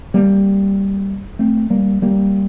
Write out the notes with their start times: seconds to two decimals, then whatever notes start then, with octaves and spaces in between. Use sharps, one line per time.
0.14 G3 A#3
1.39 A3 C4
1.70 G3 A#3
2.02 G3 A#3